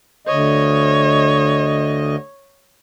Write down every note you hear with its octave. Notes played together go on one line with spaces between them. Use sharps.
D2 C#5 D#5